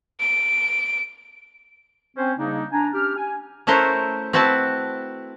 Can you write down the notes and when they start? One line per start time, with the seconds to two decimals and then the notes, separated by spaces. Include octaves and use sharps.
0.20 D7
2.17 C4 C#4 C5
2.38 C#3 G3 A#3 D4 D#4
2.72 D4 G#5 A#5
2.94 C#4 D4 G4 F6
3.17 G#5
3.67 A3 C#4 E4 A#4 C5 F#5
4.33 C4 E4 F#4 B4 A5